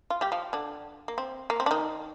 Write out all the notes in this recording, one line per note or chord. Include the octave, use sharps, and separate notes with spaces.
F4
G3 G4
F3 F4
D3 D4
A#3
C4
A#3
C4
D4
D#3 D#4